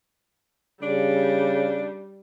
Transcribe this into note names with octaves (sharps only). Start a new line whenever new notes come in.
C#3 G3 D4